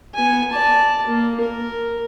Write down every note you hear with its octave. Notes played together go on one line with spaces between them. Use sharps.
B3 G#5
D5 A5
A#3
A#4